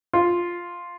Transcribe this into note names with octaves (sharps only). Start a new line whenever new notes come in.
F4